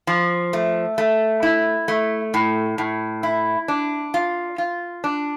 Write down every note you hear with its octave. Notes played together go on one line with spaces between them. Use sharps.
F3
A3
A3
E4
A3
A2
A2
E4
D4
F4
F4
D4